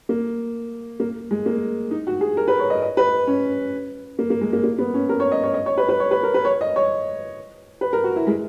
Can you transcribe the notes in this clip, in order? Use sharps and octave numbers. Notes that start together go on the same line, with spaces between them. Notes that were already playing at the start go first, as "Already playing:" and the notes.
A#3
A#3
G#3
A#3
D#4
F#4
G#4
A#4
B4
C#5
D#5
D#5
B4
C#4
A#3
A#3
G#3
A#3
A#3
B3
C#4
A#4
C#5
D#5
C#5
D#5
C#5
B4
B4
C#5
B4
A#4
B4
C#5
D#5
C#5
B4
A#4
F#4
E4
G#3